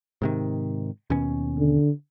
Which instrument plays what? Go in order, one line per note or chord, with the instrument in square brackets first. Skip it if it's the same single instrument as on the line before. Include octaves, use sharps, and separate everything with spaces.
[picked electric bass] G#2 C3 D#3
D#2 B2 C#4
[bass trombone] D3